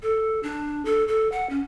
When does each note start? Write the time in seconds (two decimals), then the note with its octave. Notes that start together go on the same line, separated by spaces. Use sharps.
0.02 A4
0.43 D4
0.85 A4
1.08 A4
1.32 F#5
1.50 C#4